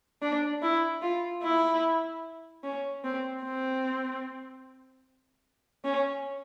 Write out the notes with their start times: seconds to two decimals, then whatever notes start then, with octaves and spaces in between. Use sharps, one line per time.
0.22 D4
0.62 E4
1.02 F4
1.43 E4
2.64 C#4
3.04 C4
3.43 C4
5.85 C#4